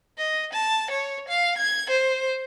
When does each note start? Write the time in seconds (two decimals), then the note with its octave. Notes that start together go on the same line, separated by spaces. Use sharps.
0.18 D#5
0.53 A5
0.91 C#5
1.28 F5
1.58 G#6
1.90 C5